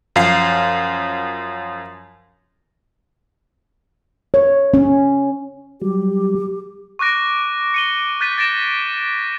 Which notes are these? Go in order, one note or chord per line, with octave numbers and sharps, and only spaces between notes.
F#2 F3 F5 C7
C#5
C#4
F#3 G3 G4
C#6 D6 F#6 A#6 D7
C#7 D#7 G7
F#6 G6 A6 B6 D#7
A6 A#6 D7 E7